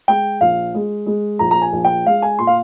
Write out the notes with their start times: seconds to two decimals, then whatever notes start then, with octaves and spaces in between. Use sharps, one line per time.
0.08 G#3 G5
0.41 A#1 F5
0.74 G#3
1.06 G#3
1.39 A#1 A#5
1.51 A#5
1.62 G#5
1.72 A#1
1.85 G5
2.06 G#3 F5
2.22 G#5
2.39 A#2 C6
2.47 F5